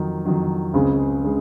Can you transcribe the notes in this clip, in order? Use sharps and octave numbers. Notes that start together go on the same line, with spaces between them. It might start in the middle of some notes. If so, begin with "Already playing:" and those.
Already playing: F2 D#3 F#3
F2 D#3 F#3
C#2 C#3 G#3 C4
C#3 G#3